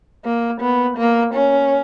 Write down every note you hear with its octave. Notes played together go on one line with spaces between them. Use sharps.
A#3
B3
A#3
C#4